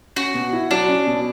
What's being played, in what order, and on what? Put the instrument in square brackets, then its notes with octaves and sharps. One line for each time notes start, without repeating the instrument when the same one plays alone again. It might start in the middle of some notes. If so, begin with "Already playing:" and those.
[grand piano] C#4 [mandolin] F#4
[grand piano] B2
E4
[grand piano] F#3 [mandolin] D4
[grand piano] C#4
B2